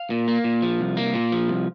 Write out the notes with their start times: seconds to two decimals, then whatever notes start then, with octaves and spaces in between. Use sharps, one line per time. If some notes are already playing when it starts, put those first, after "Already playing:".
Already playing: F5
0.10 A#2
0.28 A#3
0.44 A#2
0.62 F3
0.80 C2
0.97 A#3
1.14 A#2
1.32 F3
1.48 C2